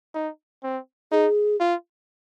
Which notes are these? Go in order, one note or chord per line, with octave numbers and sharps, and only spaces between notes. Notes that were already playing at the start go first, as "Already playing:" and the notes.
D#4
C4
D#4 G#4
F4